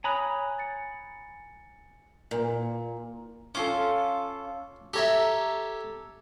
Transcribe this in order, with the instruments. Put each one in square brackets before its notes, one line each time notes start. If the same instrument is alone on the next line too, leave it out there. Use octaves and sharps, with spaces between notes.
[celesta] C#5 D#6 F#6 [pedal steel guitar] G#5 A#5 B5
[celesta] A6 C#7
[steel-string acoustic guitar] A#2
[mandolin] C#4 F4 A4 [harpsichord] D6
[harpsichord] G4 C#5 E5 [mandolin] A4 A#5